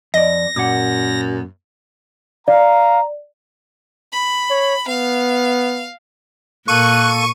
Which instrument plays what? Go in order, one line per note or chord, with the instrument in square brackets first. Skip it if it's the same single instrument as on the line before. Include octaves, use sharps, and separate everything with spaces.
[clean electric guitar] F2 D5 [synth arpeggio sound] D#5 [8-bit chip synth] A#6
[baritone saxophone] F#2 [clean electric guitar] A#2 F#5 [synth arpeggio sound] D6
[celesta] D5 [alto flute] F5 [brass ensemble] A#5
[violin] B5
[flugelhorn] C#5
[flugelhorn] B3 [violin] F5
[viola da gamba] A#2 [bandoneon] A#3 A4 [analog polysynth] C#6 D#7 [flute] F#6